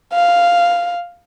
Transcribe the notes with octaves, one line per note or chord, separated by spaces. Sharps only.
F5